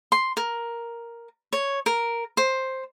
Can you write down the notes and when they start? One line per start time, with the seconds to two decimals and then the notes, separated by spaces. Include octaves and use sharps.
0.12 C6
0.37 A#4
1.53 C#5
1.86 A#4
2.37 C5